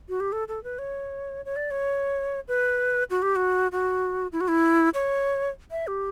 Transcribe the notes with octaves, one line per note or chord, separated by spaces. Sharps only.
F#4
G4
A4
A4
B4
C#5
C#5
D5
C#5
B4
F#4
G4
F#4
F#4
E4
F#4
E4
C#5
E5
G4